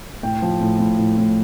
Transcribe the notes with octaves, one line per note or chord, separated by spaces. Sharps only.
A2 G5
F3
A2
A2
A2
A2